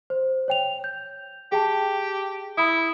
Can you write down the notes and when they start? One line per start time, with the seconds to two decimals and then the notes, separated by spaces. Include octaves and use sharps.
0.10 C5
0.48 C#5 G5 F7
0.84 G6
1.52 G4 G#4 G5 A5
2.57 E4 B5 D#6